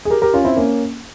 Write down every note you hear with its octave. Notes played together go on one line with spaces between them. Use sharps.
G#4
G4 A#4
G4 A#4
C#4 F4
C4 E4
A#3 C#4